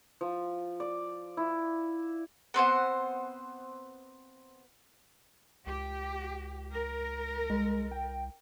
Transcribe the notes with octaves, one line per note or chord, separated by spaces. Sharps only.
F3
D5
E4
B3 C4 C5 F#5
C#2 G4
A#4
C2 G#3
G5